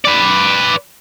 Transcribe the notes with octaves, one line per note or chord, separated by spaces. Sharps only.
B4 D5